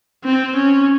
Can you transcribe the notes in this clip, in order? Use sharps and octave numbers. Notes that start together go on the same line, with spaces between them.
C4
C#4